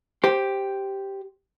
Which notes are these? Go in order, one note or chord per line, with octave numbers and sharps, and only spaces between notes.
G4 C5